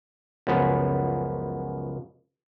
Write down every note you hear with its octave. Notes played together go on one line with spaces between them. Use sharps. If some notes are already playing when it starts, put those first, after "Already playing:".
C#2 F#2 F3 B3